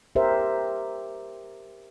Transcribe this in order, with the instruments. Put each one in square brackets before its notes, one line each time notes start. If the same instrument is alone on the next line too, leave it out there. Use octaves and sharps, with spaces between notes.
[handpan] G4 A#4 C5 E5